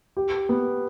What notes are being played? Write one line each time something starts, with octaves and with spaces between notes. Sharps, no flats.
G4
B3